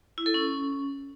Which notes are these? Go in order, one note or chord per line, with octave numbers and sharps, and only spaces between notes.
E4
A4
C#4